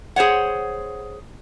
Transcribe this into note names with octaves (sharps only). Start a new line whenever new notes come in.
G#4 C5 C#5 F#5